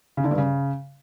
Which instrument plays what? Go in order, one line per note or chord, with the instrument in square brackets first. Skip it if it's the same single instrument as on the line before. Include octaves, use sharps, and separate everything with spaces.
[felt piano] C#3
D3
G2
C#3